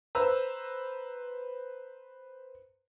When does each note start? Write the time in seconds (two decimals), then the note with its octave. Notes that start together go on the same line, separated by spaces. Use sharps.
0.15 B4 C5 A#5 E6